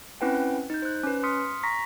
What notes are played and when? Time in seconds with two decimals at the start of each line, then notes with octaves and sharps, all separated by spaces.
0.21 C4 C#4 E4 B4 F#5 G5
0.70 D#4 G6
0.82 C5 F#6
1.03 C#4 B4
1.23 C6 D#6 F6 B6 C#7
1.63 A#5 C#6 A#6 B6